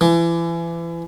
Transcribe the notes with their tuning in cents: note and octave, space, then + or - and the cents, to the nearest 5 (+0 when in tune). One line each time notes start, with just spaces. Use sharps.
E3 +30